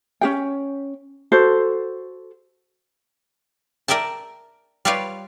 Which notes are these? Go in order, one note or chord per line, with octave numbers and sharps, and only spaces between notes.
C#4 G#4 G5
F#4 A4 C5
A#4 D5 E5 G5 A5
G3 F4 B4 C#5 D5 F5